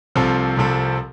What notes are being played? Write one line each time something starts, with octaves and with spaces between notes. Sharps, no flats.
C2 C3 F3 C4 A4
C2 C3 F3 C4 A4